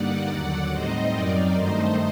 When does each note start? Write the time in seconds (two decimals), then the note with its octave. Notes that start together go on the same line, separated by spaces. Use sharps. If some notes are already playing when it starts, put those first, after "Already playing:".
Already playing: G2 D3 G3 A#3 D#4 D5 F#5
0.30 D#2 D3 F#3
0.71 A2 G3 C4 D#4 C5 D#5
1.12 F#2 F#3 C4 D#4 A#4 D5
1.54 G2 D#3 A3 D#4 C5 D#5